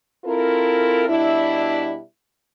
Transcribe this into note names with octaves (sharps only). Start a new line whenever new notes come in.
C4 E4 F4 A4 A#4
B2 G3 D4 E4